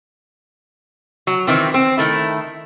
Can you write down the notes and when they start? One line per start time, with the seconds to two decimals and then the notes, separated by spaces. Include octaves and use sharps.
1.27 F#3
1.47 D#3 E3 C4
1.74 C4
1.97 D#3 A3 E4